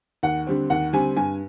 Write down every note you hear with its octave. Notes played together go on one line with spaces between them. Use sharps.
D#2 F#5
D3 G3 C4
D#2 F#5
D3 G3 C4 G#5
G2 G#5